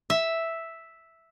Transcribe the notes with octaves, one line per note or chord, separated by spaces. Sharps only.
E5